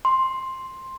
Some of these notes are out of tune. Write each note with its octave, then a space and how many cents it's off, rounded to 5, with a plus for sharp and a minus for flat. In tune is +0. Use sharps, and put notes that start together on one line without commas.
C6 +5